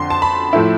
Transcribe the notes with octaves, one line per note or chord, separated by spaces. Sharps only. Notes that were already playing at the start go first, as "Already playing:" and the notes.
Already playing: F2 D3 D4 C6
A5
B5
A2 F3 A3 E4